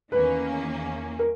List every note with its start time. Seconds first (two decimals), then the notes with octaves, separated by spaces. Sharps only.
0.12 E2 D#3 A#3 C#4 B4
1.19 A#4